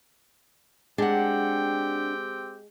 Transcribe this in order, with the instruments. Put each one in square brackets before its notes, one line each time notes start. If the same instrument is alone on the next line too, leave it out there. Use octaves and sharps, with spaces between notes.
[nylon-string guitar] G#3 [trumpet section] C4 G4 G5 [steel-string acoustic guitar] D4 F#5